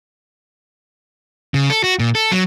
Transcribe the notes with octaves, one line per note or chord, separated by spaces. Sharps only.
C#3
A4
F#4
A#2
A4
F#3